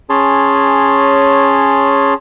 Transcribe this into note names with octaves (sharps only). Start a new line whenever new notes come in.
C#4 G#4 C#5 A5 C6